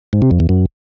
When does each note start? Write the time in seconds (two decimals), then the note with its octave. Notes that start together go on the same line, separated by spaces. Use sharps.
0.13 G#2
0.22 C3
0.31 F2
0.40 E2
0.49 F#2